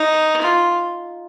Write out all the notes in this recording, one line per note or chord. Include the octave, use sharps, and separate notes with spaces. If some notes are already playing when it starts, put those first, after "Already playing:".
Already playing: D#4
F4